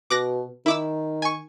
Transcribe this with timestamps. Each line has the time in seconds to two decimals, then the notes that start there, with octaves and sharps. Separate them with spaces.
0.10 B2 D6 F#6 A#6
0.66 D#3 E4 D6 E6
1.22 G#5 C#6